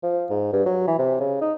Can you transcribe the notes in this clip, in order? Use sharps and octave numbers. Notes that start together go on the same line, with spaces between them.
F3
G#2
G2
F#3
E3
C3
C#3
D#4